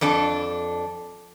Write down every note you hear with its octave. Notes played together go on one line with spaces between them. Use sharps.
F2 D4 A4 A5